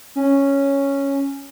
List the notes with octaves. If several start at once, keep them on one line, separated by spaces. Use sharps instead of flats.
C#4